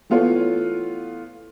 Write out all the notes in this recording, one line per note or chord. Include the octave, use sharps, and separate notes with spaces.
E3 A3 B3 F4 A4 C#5